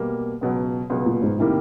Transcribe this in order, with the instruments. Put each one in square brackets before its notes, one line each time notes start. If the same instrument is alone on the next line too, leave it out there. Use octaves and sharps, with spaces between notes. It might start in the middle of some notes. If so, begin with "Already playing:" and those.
Already playing: [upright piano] B2 G3 A#3
C#2 B2 F#3
C#2 B2 F#3
[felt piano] A#2
G#2
[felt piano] A2 [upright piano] C3 D#3 G3 A#3